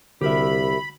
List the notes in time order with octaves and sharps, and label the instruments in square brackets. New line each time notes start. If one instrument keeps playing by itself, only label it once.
[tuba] C2 [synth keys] D3 F#4 E6 [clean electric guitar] G4 A#4 E5 [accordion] B5